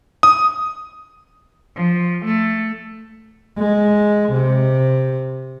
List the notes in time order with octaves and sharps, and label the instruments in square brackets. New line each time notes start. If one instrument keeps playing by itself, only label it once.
[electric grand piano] D#6
[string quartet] F3
A3
[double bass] G#3
C3